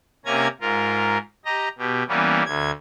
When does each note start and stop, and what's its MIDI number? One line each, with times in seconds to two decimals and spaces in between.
0.25 0.48 48
0.25 0.48 58
0.25 0.48 61
0.25 0.48 80
0.25 0.48 82
0.25 0.48 92
0.61 1.18 44
0.61 1.18 65
0.61 1.18 70
1.45 1.68 67
1.45 1.68 75
1.45 1.68 82
1.78 2.03 47
1.78 2.03 67
2.08 2.43 52
2.08 2.43 55
2.08 2.43 58
2.08 2.43 59
2.08 2.43 61
2.45 2.71 38
2.45 2.71 92